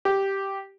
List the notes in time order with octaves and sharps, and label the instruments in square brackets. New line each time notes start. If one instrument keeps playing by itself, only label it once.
[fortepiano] G4